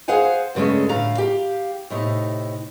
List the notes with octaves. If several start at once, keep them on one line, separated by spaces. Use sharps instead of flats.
G#4 C5 F5 F#5 G#5
G2 C#3 G#3 A3 C#4
A2 D3 F5 A#5
G4 F5
A2 C3 D#4